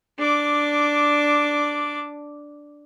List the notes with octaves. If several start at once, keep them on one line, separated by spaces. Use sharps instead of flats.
D4 D6